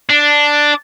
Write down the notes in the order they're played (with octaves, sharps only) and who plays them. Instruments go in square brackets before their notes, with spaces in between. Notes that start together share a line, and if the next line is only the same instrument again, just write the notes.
[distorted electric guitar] D4